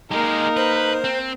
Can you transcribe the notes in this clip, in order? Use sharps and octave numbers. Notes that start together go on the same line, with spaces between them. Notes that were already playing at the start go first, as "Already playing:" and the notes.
G#3 A#3 D#4 G4 A#4
B4 C5
C4